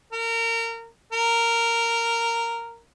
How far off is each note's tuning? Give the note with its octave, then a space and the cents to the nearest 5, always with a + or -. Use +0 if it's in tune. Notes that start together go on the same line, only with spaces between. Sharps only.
A#4 -25
A#4 -10